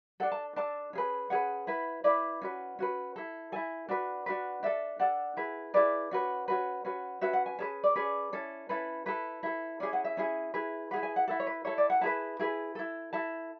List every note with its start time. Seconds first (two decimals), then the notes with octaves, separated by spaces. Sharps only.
0.20 D4 A4 F#5
0.32 A5
0.56 D4 A4 A5
0.93 C#4 G#4 B4
1.30 C#4 G#4 B4 F#5
1.67 E4 B4
2.04 E4 B4 D5
2.42 C#4 F#4 B4
2.79 C#4 F#4 B4
3.16 E4 A4
3.52 E4 A4 G#5
3.89 D4 F#4 B4
4.26 D4 F#4 B4
4.63 D4 A4 E5
4.99 D4 A4 F#5
5.37 E4 G#4 B4
5.74 E4 G#4 B4 D5
6.11 C#4 F#4 B4
6.48 C#4 F#4 B4
6.85 C#4 F#4 B4
7.21 C#4 F#4 B4 E5
7.33 F#5
7.46 G#5
7.58 C#4 G#4 B4 A5
7.84 D5
7.96 C#4 G#4 B4 D5
8.33 C#4 E4 A4
8.69 C#4 E4 A4 B4
9.06 E4 A4 B4
9.43 E4 A4
9.80 C#4 E4 G#4 D5
9.93 F#5
10.04 E5
10.17 C#4 E4 G#4
10.54 E4 G#4 B4
10.91 E4 G#4 B4 F#5
11.03 G#5
11.16 F#5
11.28 E4 A4 F#5
11.40 C#5
11.47 B4
11.65 E4 A4 C#5
11.78 D5
11.90 F#5
12.01 E4 G#4 B4 A5
12.39 E4 G#4 B4
12.75 E4 A4
13.13 E4 A4 A5